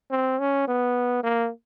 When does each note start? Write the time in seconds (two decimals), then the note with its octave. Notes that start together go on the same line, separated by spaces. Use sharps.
0.11 C4
0.39 C#4
0.68 B3
1.24 A#3